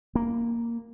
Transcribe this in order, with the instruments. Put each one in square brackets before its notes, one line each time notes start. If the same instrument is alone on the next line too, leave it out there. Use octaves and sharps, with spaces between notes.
[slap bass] A#3